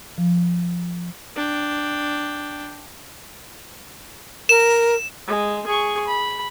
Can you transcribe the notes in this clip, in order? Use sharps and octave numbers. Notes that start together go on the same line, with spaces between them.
F3
D4 G5
A#4 E7
G#3
G#4 C#6
B5